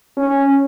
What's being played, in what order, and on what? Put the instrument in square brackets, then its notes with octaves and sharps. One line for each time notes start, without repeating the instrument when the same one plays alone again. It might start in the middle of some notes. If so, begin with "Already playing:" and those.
[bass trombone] C#4